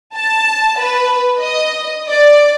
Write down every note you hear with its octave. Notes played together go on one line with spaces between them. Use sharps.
A5
B4
D#5
D5